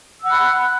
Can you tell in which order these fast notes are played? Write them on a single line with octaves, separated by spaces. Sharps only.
E6 F#5 F#6 B5